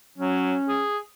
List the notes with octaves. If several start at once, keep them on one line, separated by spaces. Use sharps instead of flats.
F#3 C#4
G#4